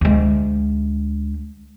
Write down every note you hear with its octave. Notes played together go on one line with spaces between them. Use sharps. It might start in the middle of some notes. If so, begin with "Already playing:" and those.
D2 G#3